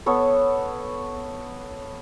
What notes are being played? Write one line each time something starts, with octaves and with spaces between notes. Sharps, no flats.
B3 A4 C#5